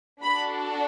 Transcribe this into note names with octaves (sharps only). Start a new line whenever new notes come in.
D4 F#4 A4 B5